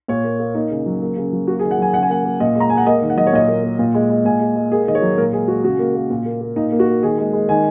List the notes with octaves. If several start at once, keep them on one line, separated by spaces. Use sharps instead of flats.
A#2 C#5
A#3
A#3
A#3 D#4
C#3
F#3
A#3
C#3
F#3
A#3 F#4
G#4
D#3
F#5
F#3 G#5
C#3 F#5
G#5
A#3 F#5
A#3
A#2 D#5
G#3
A#5
G#3 G#5
F#5
A#3 D#5
D#3
F#5
F#3 D#5
C#5
A#2 D#5
A#3
A#3
A#2
G#3
G#3
A#2 G#5
G#3
G#3
A#3 G#4
D#3 D#5
C#5
F#3
A#2 A#4
G#3 G#4
G#3 F#4
C#3 F#4
A#3
A#3
A#2
A#3
A#3
A#2 D#4
A#3
F#4
A#3
D#3 G#4
G#3
G#3
D#3 G#5